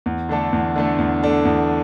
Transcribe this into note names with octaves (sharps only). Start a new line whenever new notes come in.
E2
D3 A3 D4 A4
E2
D3 A3 D4 A4
E2
D3 A3 D4 A4
E2